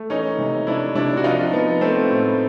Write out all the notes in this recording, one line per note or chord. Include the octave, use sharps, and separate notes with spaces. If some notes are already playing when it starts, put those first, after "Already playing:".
Already playing: A3
E3 C#4 D#4
C3
C3 D4 E4
C3 D4 E4
F#4
F3 D#4 F4
F3 B3
A3 C4
A2